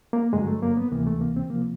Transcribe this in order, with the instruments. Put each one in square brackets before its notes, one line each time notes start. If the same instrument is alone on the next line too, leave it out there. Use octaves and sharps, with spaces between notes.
[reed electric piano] A#3
G2 D3 F#3 G#3
A3
A#3
B3
D2 C3 E3 A#3
A3
A#3
C4
C3 F3 A#3